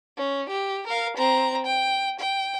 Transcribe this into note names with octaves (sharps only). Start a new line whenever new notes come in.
C#4
G4
A#4 F5
C4 A#5
G5
G5